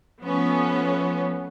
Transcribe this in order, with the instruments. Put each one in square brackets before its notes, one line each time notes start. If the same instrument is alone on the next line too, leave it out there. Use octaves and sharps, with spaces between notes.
[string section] F3 A3 B3 C#4